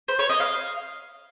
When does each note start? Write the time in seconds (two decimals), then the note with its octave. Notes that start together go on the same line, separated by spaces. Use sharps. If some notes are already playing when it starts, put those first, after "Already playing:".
0.08 C5
0.19 C#5
0.29 D#5
0.40 F5